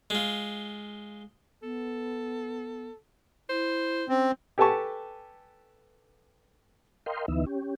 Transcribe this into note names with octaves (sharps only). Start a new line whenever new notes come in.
G#3 F4
B3 A4
E4 C5
C4 C#4
G4 A4 B4 G#5 A5 C#6
A#4 D#5 F5 G5 C6
D2 E3 B3 D#4 E5
C#4 G4